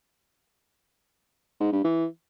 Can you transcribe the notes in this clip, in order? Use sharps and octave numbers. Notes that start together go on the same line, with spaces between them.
G#2
G2
E3